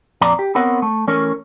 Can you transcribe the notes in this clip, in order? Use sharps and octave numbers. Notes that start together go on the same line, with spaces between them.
F2 A#2 D5 A#5
G4
B3 C4 A#4 C#5 F#5
A3
E3 A3 C#4 A#4 C#5